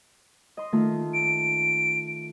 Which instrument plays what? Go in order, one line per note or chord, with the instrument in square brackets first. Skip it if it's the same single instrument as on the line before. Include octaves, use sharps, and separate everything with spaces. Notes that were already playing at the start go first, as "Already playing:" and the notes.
[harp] D#5 C6
D#3 A3 F4
[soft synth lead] D7